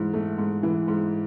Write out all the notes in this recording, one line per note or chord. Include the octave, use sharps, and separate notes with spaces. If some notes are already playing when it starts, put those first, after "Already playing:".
Already playing: G#2 E3
A3
G#2
E3
G#2